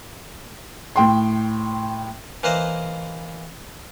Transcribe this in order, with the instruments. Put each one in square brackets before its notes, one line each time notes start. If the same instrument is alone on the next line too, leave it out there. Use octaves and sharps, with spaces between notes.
[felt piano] A2 G5 C6
[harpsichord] E3 A#3 B4 C5 D#5